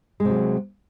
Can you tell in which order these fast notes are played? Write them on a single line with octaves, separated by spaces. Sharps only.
G#3 C3 F#3